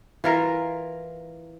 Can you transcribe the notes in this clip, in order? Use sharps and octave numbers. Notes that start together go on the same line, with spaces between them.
E3 F4 A#4